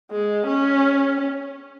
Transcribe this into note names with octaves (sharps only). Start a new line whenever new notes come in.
G#3
C#4